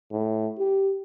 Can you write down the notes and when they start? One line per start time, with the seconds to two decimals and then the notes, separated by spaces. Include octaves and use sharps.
0.12 A2
0.59 G4